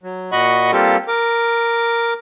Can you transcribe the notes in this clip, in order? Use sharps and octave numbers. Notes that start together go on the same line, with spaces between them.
F#3
A#2 F#4 D#5 F#5 B5 C#6
G3 A#3 C4 F4 G4 A4
A#4 D6